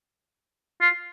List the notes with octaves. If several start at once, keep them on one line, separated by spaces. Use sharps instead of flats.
F4